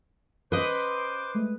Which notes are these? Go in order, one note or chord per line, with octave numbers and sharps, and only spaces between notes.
C#4 B4 C5 D#5 C6 D6 D7
G#3 A3